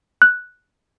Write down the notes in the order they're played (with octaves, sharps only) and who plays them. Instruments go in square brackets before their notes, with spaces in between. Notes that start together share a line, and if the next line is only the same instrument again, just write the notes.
[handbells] F#6